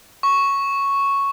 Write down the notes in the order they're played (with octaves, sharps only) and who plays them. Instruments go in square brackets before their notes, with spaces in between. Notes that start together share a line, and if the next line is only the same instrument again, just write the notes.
[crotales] C#6